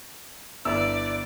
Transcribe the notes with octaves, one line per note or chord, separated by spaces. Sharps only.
G1 E4 D5 E6